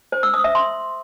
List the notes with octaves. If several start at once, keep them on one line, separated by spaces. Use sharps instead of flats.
C5
E6
D#6
E5
C6